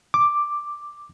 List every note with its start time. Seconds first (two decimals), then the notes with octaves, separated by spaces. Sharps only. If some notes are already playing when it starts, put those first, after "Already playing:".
0.14 D6